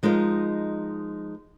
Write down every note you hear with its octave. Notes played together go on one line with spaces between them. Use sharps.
F3 G#3 D#4 A#4 D#5 F5